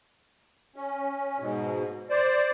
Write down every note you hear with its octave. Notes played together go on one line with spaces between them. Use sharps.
C#4
G#2 B2
C5 D5